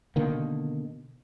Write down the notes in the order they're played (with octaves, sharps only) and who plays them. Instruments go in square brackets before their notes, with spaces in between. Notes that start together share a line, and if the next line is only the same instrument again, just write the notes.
[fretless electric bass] B2 D3 D#3 A#3